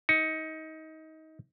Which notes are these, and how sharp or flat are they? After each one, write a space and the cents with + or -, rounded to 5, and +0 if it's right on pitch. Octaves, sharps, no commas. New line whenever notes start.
D#4 +25